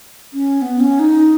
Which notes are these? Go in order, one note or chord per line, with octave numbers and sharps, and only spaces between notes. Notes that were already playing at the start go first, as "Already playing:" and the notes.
C#4
B3
C#4
D#4